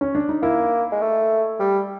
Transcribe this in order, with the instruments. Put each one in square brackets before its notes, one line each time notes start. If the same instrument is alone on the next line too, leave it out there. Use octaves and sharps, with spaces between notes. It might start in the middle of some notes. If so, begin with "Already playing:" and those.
[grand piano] C#4
D4
D#4
[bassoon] A#3 [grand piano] E4
[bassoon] G#3
A3
G3